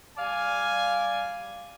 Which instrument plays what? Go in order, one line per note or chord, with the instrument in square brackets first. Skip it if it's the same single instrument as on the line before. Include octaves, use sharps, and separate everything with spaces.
[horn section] G3 D5 F5 G#5